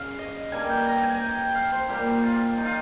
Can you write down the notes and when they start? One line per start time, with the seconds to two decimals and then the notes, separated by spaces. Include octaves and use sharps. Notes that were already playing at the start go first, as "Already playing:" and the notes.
Already playing: C#3 F5
0.19 D#5
0.52 G2 G3 A#3 G#5
0.69 G5
0.86 A#5
1.03 G#5
1.14 G#5
1.20 G5
1.38 G5
1.55 F5
1.72 C5
1.89 A#2 G3 A#3 G4
2.23 F4
2.58 D#4
2.65 F4